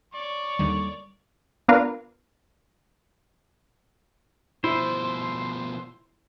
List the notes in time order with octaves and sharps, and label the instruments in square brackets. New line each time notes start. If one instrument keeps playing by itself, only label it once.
[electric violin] C#5 D5 [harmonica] C#6
[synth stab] D#2 D3 D#3 [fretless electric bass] G3
[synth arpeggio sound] B3 D4 F4 A#4 B4 F5
[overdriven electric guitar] B2 F3 [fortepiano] E4 [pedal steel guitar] C5